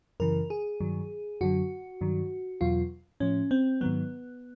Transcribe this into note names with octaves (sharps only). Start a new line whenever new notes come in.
F#2 C#3 E3 A#4
G#4
G2 D#3 F#3
F#2 D3 F#3 F#4
G2 D#3 F#3
E2 B2 F#3 F4
A2 F3 C#4
C4
G#2 D#3 F#3 B3